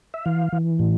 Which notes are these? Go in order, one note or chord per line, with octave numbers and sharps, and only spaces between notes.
E5
E3 F5
E3
A2